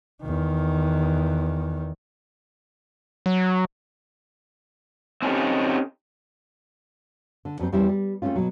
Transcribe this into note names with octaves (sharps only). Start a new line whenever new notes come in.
E2 D#3
F#3
C4 C#4 D#4 G4 A4
D3
F2 F#3 C4 C5
E2 G3 C#4 E4 C5
G3
A3 A#3 C4 C#4 F4
B2 F#3